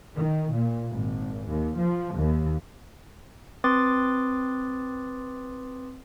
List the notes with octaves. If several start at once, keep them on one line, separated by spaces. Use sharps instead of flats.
D#3
A#2
G#1
D#2
F3
D#2
C4 B4 C6 D6 D#6 A6